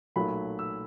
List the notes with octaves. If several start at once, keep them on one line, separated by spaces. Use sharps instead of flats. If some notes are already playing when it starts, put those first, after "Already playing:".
B1 A#2 F#3 A3 B5
E6